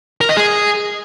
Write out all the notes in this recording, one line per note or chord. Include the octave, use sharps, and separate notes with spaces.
A#4
D#5
G#4